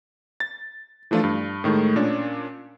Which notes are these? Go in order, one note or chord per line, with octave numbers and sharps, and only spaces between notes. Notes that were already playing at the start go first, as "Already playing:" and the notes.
A6
E3 F3 A3 D4 F4
G2
A2 D#3 G#3 A3
A#2 C#4 D4